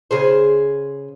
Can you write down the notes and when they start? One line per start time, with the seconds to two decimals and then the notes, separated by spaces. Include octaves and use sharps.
0.11 C#3 G#4 C5